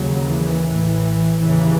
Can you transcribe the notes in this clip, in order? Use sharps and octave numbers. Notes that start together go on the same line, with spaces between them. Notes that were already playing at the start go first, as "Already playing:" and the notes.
Already playing: D#2 C#3 F#3
E3
A1 A2
D#2 C#3 E3